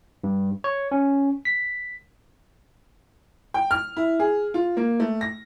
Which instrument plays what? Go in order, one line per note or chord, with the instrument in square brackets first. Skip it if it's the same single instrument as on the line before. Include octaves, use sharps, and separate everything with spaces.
[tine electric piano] G2
C#5
C#4
B6
[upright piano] G5
F6
E4
G#4
F4
A#3
A3
A#6